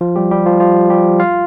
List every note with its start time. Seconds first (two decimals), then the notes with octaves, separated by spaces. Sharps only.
0.01 F3 F4
0.16 G3 G4
0.31 G3 G4
0.46 F3 F4
0.60 F3 F4
0.90 G3 G4
1.19 F4 F5